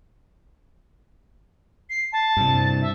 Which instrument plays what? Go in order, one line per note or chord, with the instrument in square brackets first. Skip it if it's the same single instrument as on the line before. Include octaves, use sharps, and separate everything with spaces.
[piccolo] C7
A5
[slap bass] G2 C3
[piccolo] E5